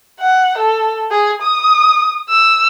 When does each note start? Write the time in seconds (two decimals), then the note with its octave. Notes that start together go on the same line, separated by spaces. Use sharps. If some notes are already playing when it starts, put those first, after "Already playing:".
0.20 F#5
0.58 A4
1.11 G#4
1.42 D#6
2.29 E6